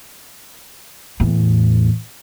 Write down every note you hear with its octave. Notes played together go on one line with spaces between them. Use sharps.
E2 A2